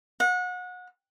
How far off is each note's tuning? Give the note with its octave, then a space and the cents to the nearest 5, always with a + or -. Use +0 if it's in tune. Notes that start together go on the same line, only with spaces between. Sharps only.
F#5 -30